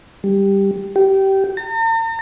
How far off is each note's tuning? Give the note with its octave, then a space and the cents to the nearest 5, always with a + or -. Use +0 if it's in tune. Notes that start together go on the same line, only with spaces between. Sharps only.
G3 +5
G4 -20
A#5 -45